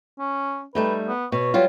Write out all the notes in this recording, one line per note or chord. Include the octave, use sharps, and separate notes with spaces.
C#4
G3 A3 D#4 B4
B3
B2 C#5
F#3 G3 F4